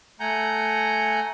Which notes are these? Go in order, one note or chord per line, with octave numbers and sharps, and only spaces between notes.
A3 F#5 G#5 A#5 G6